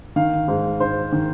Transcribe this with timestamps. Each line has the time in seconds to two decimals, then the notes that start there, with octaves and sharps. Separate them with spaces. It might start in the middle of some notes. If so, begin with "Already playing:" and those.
0.16 D#3 F5
0.48 G#2
0.80 G#2 C5
1.12 D#3